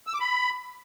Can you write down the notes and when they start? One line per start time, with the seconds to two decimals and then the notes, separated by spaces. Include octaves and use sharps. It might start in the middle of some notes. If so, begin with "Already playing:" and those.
0.07 E6
0.14 D6
0.20 B5